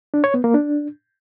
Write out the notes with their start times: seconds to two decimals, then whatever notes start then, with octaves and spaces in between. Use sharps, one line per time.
0.14 D4
0.24 C#5
0.34 B3
0.44 A#3
0.54 D4